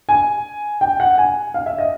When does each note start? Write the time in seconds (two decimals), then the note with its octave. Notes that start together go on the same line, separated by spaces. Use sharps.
0.09 G#5
0.81 G5
1.00 F#5
1.18 G#5
1.54 F5
1.66 E5
1.78 D#5